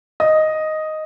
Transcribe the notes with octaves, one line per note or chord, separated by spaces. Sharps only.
D#5